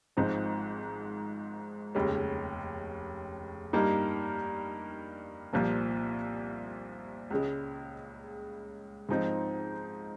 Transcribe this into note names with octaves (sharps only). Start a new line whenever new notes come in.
G#1 G#2 F3 C4 D#4
F1 D#2 C#3 G#3 C#4
G2 G3 A#3 D#4
C2 A#2 F3 A#3
C#2 C#3 G#3
G#2 F3 C4 D#4